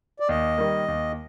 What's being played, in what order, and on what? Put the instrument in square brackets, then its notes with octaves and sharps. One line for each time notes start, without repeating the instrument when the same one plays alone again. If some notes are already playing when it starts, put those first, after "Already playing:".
[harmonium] D5
[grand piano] D#2 [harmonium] D#5
[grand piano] D#3 G3 A#3
D#2